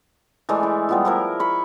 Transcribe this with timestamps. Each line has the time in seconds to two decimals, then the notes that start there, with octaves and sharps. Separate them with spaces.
0.49 E3 G#3 A3 D5
0.63 E4
0.89 G3 B3 F4
1.05 F3 E4 A#4
1.40 B5 C#6